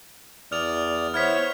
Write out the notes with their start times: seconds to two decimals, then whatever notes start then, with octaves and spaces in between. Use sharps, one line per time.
0.52 E2 D5 D#6 F6 F7
1.14 B3 E4 C5 C#5 F6 G#6 B6